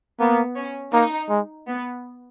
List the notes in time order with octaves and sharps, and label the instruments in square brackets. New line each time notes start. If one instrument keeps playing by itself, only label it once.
[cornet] A#3 [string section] B3
[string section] C#4
[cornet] A#3 [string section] D#4
[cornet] G#3
[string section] B3